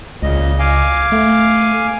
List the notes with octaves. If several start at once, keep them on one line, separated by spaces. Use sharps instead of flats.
C#2 A#2 C#3 D#5
F5 G#5 D6
A3